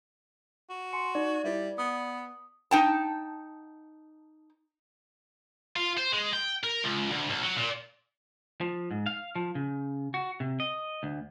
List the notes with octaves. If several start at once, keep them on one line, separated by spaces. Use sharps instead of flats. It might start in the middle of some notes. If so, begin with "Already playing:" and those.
F#4
G#5 C6 C#7
D#4 D5
G3 E4 B4 E5
B3 D#6
D#4 G5 A5
F4
C5
G#3
G5
A#4
C#2
D2
B1
F#3
A#2
F3
G#2
F5
F3
C#3
F#4
C3
D#5
D2